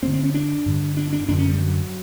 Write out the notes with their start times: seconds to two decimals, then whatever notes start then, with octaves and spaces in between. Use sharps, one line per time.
0.02 G2 C4
0.06 D3
0.13 C4
0.23 C#4
0.34 D4
0.66 G2 D3
0.97 D4
1.13 D4
1.28 F#2 D3 D4
1.38 C#4
1.49 G3
1.59 F#3